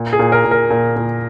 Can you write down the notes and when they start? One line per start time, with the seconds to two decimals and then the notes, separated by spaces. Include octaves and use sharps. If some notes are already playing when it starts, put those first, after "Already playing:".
Already playing: A#2
0.13 G#4
0.19 A#2
0.32 A#4
0.45 A#2
0.51 A#4
0.70 A#2
0.96 A#2